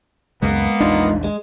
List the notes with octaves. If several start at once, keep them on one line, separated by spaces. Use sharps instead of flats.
C#2 F#2 C#3 G#3 A#3 B3
A#1 E2 D4 D#4 F4
G#3